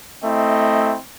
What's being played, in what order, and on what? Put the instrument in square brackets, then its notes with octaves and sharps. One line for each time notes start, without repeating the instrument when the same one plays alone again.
[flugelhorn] A3 [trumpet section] C4 E4 D#5